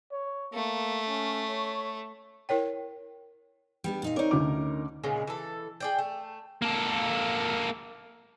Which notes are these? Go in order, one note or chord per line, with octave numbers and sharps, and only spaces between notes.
C#5
A3 A#3
C#4
C#5
E4 A#4 C#5 G5
G3 B3 D4
A#2 D#4 F5
C4 D#4 A#4 C#5 D5
D2 C#4 D6
A#2 C#3 G#3 B3
E3 A4
G#4 D5 G5
A3
A#3 A4